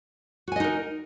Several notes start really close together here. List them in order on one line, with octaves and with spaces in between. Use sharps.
F#4 G#5 D#5 D#4 A#4